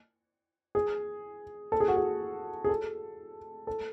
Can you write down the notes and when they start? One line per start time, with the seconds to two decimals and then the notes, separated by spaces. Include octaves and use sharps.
0.75 G#4
1.72 A4
1.80 G#4
1.88 F#4
1.96 G#4
2.64 G#4
2.69 A4
3.67 A4